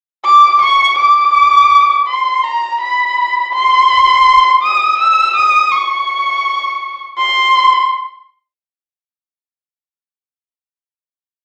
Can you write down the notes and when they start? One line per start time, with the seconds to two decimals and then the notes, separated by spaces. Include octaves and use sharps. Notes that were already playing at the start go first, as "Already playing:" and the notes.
0.24 D6
0.61 C#6
0.98 D6
2.07 C6
2.43 A#5
2.80 B5
3.53 C6
4.62 D#6
4.99 E6
5.36 D#6
5.71 C#6
7.18 C6